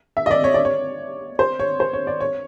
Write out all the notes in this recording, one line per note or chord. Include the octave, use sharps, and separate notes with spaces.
E5
D#5
D5
C#5
D5
C#5
C5
C#5
C5
C#5
D5
C#5